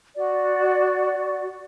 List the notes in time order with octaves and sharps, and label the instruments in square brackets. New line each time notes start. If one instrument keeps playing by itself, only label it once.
[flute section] F#4 D5